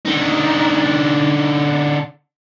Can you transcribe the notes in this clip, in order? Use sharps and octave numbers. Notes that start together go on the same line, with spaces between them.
D3 D#4